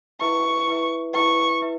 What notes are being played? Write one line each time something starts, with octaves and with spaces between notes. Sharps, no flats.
E4 B4 E5 C#6
E4 B4 E5
E4 B4 E5 C#6
E4 B4 E5